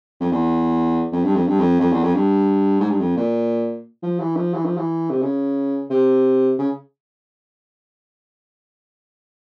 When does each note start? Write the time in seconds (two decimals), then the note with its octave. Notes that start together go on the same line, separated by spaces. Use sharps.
0.20 F2
0.32 E2
1.12 F2
1.24 G2
1.35 F2
1.47 G2
1.59 F2
1.80 F2
1.92 E2
2.03 F2
2.14 G2
2.80 G#2
2.90 G2
3.00 F2
3.17 A#2
4.03 F3
4.19 E3
4.36 F3
4.54 E3
4.65 F3
4.77 E3
5.10 C3
5.22 C#3
5.90 C3
6.58 C#3